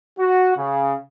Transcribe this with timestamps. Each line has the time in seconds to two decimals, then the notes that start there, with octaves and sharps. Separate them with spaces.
0.18 F#4
0.56 C#3